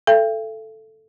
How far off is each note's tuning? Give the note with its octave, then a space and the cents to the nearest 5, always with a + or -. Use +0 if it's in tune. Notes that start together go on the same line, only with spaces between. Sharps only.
A4 +0 E5 +45 G5 +0